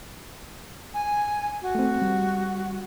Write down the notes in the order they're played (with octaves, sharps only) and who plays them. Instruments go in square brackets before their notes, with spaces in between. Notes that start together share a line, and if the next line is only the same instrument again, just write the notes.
[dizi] G#5
F#4
[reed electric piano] A3 C4
G3